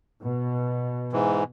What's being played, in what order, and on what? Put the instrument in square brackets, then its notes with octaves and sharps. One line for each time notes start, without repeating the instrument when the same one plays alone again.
[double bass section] B2
[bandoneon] G#2 E3